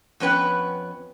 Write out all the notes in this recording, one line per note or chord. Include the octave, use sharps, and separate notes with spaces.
F2 B3 C#4 B4 G5